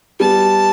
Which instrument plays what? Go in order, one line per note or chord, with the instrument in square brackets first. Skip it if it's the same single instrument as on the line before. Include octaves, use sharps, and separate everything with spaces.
[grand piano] G3 B3 [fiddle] A5